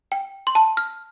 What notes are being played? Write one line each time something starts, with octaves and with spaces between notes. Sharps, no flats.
G5
C6
A5
F6